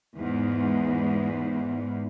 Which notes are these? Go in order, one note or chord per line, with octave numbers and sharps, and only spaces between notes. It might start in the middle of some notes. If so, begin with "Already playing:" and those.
E2 G#2